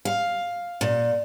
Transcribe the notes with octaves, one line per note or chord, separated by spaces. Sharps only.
F5
A#2